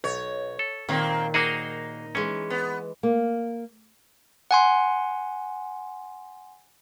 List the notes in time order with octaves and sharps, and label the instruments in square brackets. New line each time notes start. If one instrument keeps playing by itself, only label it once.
[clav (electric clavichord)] B1 [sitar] C#5
[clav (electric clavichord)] A4
[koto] A#2 D#3 [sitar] A#3 C4
[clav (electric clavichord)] A#3 F#4 G#4 [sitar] D#4
[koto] E3 G#3 [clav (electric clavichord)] C#4
[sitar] B3
[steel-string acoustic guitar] A#3
[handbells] F#5 G#5 C6